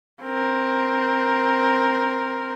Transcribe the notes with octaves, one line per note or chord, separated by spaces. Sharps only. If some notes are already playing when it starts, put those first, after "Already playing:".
C4 A#4